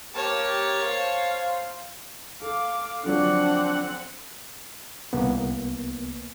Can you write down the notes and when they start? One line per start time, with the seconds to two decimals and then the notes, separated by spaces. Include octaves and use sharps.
0.14 A#3 G4 A#4 C#5 A5
0.83 C5 F5
2.42 A4 F5 D6
3.04 D3 F3 F#3 C4 D4 F#5
5.13 C2 A#3 B3